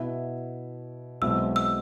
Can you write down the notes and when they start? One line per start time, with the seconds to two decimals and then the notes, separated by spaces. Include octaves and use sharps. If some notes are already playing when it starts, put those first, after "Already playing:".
Already playing: B2 B3 E4
1.21 B1 B2 G#3 C4 E4 E6
1.56 E6